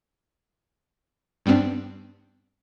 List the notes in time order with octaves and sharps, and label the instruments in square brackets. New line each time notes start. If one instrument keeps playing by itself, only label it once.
[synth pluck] G2 G3 B3 C4 D4